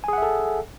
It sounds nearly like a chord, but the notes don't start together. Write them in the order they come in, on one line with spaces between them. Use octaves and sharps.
G#5 G#4 F#5 E5 A4